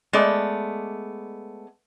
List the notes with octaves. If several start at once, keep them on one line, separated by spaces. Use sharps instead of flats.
G#3 A3 B3 D5